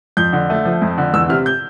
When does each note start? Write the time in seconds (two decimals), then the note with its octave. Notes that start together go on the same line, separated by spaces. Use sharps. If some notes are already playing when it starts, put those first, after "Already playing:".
0.17 F2 G6
0.33 D3
0.50 A3
0.65 F3
0.82 F2
0.98 D3
1.13 E2 E6
1.29 C3 F6
1.46 G6